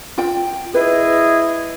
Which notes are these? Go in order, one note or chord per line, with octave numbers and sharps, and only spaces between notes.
F4 G5
E4 G#4 B4 D#5